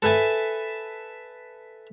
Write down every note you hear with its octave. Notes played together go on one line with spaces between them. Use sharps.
A4 B4 E5 G#5 A5